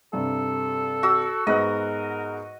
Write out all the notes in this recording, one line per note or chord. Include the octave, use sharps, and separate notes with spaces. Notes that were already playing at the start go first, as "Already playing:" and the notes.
G2 C3 A4
F#4 E6
G#2 B3 A#4 D#5 F#6